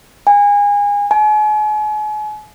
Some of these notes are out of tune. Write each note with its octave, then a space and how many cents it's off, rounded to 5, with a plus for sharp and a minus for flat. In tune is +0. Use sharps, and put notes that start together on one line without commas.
G#5 -25
G#5 +40